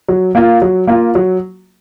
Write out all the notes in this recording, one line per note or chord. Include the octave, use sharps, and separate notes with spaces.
F#3
A#3 F4
F#3
A#3 F4
F#3